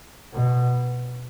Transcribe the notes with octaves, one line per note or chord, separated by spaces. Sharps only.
B2